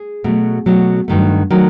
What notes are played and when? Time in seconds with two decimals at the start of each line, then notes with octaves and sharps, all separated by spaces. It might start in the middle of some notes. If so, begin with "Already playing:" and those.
Already playing: G#4
0.24 B2 F#3 A3
0.66 B2 F#3 A3
1.08 G2 D#3 F#3 A3
1.50 D#3 F#3 A3